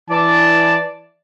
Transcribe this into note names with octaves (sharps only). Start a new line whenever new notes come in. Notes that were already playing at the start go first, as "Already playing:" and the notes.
E3 D5 A5